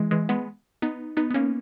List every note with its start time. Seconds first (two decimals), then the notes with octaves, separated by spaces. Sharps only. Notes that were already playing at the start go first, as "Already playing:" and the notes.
Already playing: E3 G#3
0.11 E3 G#3
0.29 G#3 B3
0.82 B3 D#4
1.17 B3 D#4
1.31 B3
1.34 A#3 C#4